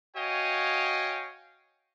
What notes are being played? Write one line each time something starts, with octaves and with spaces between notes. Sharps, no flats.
F#4 C#5 D#5 F5 G5 G#5